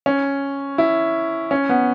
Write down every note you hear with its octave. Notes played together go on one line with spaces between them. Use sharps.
C#4
E4
C#4
B3